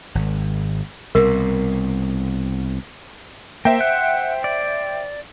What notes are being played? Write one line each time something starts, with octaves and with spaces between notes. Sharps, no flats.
G#1
C2 B2 A#4
A#3 C5 E5 G5
F#5
D5